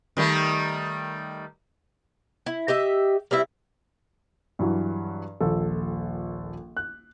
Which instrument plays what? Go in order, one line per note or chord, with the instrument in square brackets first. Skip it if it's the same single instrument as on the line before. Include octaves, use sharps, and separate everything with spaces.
[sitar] D#3 G3 A3
[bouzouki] E4
G4 D#5 E5
G3 C4 E4 E5
[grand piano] G2 E3 F#3
D#1 A#1 A4
F#6